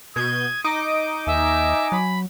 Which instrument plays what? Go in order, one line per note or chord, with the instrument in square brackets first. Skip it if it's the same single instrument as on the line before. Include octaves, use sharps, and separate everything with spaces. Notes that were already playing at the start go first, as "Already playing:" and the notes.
[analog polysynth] B2 G6 D#7 [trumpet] D#6 [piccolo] G#6
[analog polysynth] D#4 D#5 D6 [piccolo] D7
[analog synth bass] D#2 [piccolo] E5 [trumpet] G#5
[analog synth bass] F#3 [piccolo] B5